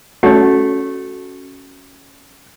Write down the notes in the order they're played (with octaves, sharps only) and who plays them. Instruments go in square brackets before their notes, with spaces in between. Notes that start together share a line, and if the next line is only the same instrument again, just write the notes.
[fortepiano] A3 [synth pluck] C#4 F#4